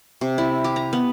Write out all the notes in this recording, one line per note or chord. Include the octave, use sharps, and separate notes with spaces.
C3
E4
G4
A#5
B3